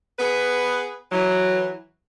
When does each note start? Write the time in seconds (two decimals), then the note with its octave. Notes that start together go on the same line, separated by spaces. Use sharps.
0.19 B3 G#4 B4
1.11 E3 F#3